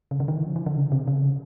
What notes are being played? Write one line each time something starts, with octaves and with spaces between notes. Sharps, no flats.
C#3
D3
D#3
E3
F3
E3
D3
C#3
C3
C#3